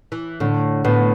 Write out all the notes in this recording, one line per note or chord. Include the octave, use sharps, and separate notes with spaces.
E3
A2 D3
A2 B3